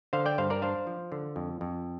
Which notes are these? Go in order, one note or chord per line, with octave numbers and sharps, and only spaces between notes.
D3 C5 F5
D5 G5
G2 C5 F5
A#4 D5
D4 C5 F5
F3
D3
F2
F2